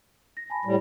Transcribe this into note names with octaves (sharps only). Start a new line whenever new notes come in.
A#6
G#5 A5 B5
A2 G3